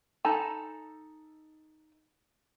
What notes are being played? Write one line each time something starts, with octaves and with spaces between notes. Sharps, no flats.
D#4 A4 G#5 A5 B5